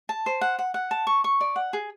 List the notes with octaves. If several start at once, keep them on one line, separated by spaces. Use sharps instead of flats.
A5
C5
F#5
F#5
F#5
A5
C#6
C#6
D5
F#5
G#4